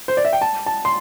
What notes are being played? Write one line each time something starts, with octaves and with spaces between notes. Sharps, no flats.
C5
D5
E5
G5
A5
A5
C6